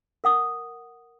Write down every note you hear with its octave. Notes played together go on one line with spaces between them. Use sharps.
A#4 F#5 D#6